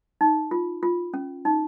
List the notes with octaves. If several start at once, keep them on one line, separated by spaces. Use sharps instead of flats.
D#4
F4
F4
C#4
D#4